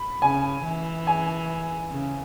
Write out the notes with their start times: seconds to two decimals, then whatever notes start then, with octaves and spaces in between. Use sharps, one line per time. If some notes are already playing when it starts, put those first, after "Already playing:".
Already playing: B5
0.22 C#3 G#5
0.65 E3
1.07 G#5
1.91 C#3